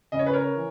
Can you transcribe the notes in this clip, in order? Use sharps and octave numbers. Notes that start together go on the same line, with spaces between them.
C#3 D#5
C#5
B4
A#4 C#5
E3